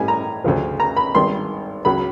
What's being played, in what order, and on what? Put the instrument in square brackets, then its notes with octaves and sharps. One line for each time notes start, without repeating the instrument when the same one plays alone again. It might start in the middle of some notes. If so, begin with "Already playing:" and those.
Already playing: [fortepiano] A2 G3 G#5
A#5
D2 C#3 F3
A#5
B5
G#1 G2 D#3 C6
C#2 C#3 F#3 B5